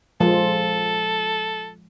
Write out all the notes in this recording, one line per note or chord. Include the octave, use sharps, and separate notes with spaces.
F3 G#3 A4